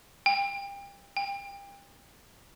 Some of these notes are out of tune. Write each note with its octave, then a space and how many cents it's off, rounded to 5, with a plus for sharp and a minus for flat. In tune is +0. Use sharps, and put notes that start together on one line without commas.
G5 +30
G5 +30